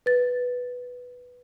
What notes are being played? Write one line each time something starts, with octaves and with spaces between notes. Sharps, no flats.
B4 A6